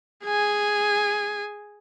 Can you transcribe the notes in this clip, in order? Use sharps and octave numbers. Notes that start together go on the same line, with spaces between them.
G#4 G#5